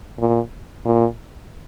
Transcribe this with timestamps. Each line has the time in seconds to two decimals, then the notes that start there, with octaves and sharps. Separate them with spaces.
0.19 A#2
0.85 A#2